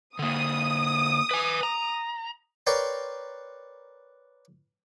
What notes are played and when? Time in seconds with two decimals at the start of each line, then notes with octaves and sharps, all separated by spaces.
0.19 D3 A#3 D#6
1.31 B4 G#5
1.63 A#5
2.67 A#4 B4 C#5 D5 G5 C6